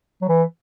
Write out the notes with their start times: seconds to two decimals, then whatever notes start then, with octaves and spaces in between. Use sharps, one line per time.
0.22 F#3
0.29 E3